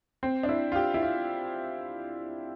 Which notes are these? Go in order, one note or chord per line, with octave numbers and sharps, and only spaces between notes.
C4
D4
E4
F4
G4
E4
F4